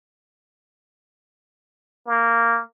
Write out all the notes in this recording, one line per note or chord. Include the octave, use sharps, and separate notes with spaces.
A#3